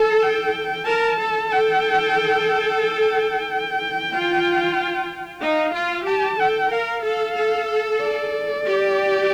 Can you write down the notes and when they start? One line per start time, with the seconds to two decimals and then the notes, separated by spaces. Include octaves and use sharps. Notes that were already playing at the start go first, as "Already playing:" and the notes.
Already playing: A4 A5
0.22 G5
0.87 A#4 A5
1.19 A4
1.52 A4 G5
2.82 G5
4.12 F4
5.41 D#4 F5
5.73 F4
6.06 G4 A5
6.39 A4 G5
6.71 A#4 F5
7.03 A4
7.36 A4
8.01 D5
8.66 G4